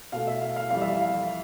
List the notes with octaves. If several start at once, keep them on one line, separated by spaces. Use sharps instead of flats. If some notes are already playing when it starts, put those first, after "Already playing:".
B2 A3 F5
E5
F5
F5
F2 E3 G3 F5
E5
F5
F5